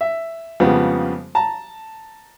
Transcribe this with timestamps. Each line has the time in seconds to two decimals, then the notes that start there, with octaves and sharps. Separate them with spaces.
0.01 E5
0.60 F2 C#3 F3 G3 G#3 B3
1.35 A5 A#5